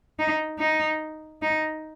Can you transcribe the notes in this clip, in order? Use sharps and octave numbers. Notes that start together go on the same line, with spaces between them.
D#4
D#4
D#4